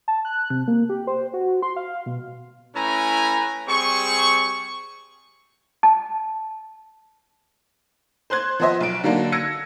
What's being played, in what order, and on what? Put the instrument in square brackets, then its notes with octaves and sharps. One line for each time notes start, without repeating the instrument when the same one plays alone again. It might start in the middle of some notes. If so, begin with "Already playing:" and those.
[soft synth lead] A5
F#6
C3
A#3
G4
C5
F#4
C6
F5
B2
[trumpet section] A3 C#4 E4 B4 G#5 A#5
G3 C4 G#4 C#6
[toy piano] A5
[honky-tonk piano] C5 C6 F#6 G#6
F3 B3 C5 D#5 E5
B1 D7
D3 F#3 A#3 D4 D#4
E6 G#6 A#6 C#7